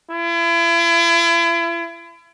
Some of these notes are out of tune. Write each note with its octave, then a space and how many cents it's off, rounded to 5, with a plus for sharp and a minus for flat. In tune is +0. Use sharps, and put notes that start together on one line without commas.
E4 +40